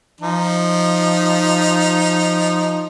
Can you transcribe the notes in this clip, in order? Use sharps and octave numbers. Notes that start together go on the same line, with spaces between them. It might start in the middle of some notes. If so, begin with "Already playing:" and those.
F3 D#4